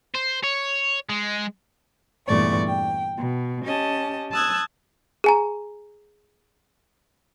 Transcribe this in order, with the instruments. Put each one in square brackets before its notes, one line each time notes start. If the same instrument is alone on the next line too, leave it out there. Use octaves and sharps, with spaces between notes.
[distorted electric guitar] C5
C#5
G#3
[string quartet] E2 G2 A#2 A3 D5 C#6
G5
B2
C#4 G4 D#5 A5
A5 D#6 E6 F#6 G#6
[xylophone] G#4 G#5 A#5